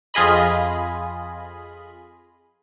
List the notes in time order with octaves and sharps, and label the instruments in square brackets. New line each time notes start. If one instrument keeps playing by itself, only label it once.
[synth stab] F2 F4 G#4 D#5 B5